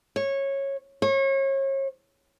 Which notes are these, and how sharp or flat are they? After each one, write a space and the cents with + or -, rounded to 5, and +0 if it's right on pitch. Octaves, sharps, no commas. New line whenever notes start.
C#5 -15
C#5 -35